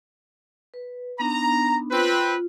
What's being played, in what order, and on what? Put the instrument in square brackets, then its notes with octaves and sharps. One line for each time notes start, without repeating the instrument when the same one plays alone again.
[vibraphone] B4
[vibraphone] B3 D4 D#4 [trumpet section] A#5
[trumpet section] C4 B4 [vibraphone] F4